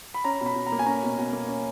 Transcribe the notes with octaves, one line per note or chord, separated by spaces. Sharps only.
B5
C#4 A#5
B2
B5
B2
A#5
A#3
G#5
C#4 A#5
B2
B2
A#3
C#4